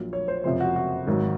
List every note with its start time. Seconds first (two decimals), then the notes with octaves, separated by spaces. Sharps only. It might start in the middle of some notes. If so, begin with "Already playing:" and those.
Already playing: A#1 A#2 F#3
0.13 C#5
0.28 C5
0.44 F#1 F2 C3 F3 C5
0.60 F#4
0.76 F#4
1.07 G#1 G#2 F#3